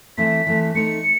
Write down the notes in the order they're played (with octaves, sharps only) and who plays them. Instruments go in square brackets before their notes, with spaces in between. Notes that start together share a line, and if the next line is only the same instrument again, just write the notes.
[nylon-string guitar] E3 A3 C4 [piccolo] B6
[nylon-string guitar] E3 A3 C4
[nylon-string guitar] A3 C4 D#4 [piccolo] C#7